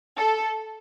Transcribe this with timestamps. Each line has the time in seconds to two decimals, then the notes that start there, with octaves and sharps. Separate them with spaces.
0.18 A4